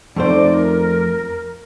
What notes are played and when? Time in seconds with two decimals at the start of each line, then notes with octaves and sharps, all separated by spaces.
0.16 F2 A3 D#4 C5 D5
0.57 A#4